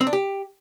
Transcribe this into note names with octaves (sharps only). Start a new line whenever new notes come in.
C4
D4
G4